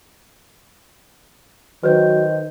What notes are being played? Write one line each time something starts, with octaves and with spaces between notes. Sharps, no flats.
D#3 F#3 B4 C5 G6